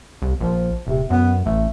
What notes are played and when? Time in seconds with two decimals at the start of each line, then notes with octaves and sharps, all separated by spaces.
0.22 C2
0.41 A#1 F3
0.87 D#1 C3
1.10 F#2 B3
1.46 A1 A3